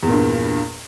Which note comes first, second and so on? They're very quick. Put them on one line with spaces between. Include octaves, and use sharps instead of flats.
E2 A#2 G2